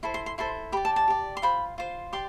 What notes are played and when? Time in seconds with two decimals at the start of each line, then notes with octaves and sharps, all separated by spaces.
0.03 E4 A4 C5 C6
0.14 C6
0.26 C6
0.38 E4 A4 C5 C6
0.72 G4 B5
0.77 D5
0.85 A5
0.96 A5
1.08 G4 D5
1.37 C6
1.42 F4 C5 B5
1.78 F4 C5
2.13 G4 D5 C6